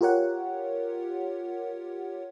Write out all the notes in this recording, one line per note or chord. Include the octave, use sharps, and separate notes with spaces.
F4 G4 A#4 C#5 F#5